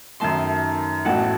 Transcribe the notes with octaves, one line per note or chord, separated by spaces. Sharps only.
F#2 D#3 A3 D#4 A5 C6
A1 A2 F#3 F#5 A5